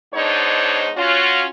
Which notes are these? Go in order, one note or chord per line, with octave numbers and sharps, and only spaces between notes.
G#2 B2 D4 D#4 C5 C#5
C#4 F4 F#4